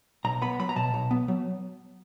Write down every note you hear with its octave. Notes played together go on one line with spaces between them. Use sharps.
B1 A#5
B3 B5
F#3 B5
A#5
B2 A5
B1
B3
F#3